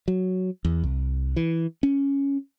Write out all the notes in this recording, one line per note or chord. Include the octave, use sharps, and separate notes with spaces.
F#3
E2
C2
E3
C#4